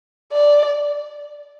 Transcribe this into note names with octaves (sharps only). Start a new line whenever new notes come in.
D5